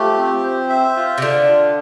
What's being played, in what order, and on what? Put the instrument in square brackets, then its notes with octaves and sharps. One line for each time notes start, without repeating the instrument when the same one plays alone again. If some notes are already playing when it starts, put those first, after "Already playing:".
Already playing: [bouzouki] F3 [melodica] A3 G4
[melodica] C4
C5
E5
F4
[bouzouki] C3
[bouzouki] D3 [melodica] F4
[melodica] F4